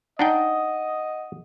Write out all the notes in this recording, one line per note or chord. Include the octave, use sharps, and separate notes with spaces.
D4 D#4 D#5 F#5 G5